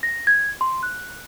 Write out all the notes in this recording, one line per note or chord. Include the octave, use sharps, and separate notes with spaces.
A#6
G#6
C6
F#6